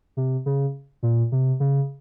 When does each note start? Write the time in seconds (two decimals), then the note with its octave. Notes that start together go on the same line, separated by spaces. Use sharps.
0.17 C3
0.46 C#3
1.03 A#2
1.32 C3
1.60 C#3